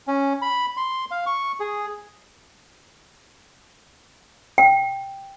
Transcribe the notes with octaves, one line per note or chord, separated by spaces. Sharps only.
C#4
B5
C6
F5
C#6
G#4
G5